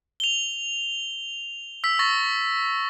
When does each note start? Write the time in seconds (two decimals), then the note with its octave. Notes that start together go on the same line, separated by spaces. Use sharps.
0.20 F7 G7
1.84 E6 B6
1.99 C#6 A6 A#6